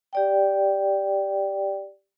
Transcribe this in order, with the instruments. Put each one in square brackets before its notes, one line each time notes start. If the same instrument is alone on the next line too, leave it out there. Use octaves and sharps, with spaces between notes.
[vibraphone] G4 D5 G5